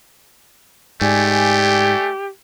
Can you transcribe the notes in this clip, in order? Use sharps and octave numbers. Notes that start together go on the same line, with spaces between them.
G#2 A3 G4 D5 G#5